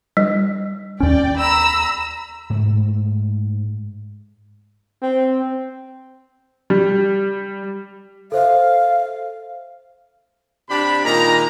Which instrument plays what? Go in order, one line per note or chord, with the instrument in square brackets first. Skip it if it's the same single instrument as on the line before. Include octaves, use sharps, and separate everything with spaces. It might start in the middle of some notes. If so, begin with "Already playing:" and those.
[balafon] G3
[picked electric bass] D#2 C#4 [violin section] D5 G5
[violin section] A#5 B5 E6
[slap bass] G#2 A3
[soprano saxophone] C4
[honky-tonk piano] G3
[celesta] A4 C5 E5 [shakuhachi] F5
[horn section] C3 D4 G4 B5
A#2 D#3 G#3 A#5